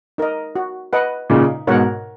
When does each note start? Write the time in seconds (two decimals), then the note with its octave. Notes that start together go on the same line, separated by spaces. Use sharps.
0.18 D#4 A#4 D#5
0.56 F#4
0.93 B4 D#5 F#5
1.30 A#2 C#3 D#4
1.67 G#2 B2 A#4 C#5 F#5